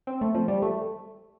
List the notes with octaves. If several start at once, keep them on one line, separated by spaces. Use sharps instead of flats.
C4
A3
F3
G3
A3